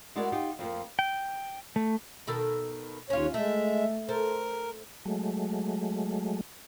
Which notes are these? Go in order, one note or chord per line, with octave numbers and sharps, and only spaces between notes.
G#3 E4 F#4 G#4 A#4 D5
D#4 F4 G4
F2 F3 A#3
G5
A3
B2 D#3 A4
D#2 C#4 F4 C#5
G#3 A3 E5
A4 A#4 C5
F#3 G#3 A3